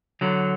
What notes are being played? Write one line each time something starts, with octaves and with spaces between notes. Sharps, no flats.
D3 F#3